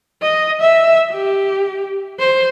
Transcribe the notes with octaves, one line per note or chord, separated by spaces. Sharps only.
D#5
E5
G4
C5